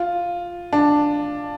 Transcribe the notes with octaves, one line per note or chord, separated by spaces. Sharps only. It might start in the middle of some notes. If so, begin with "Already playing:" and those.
Already playing: F4
D4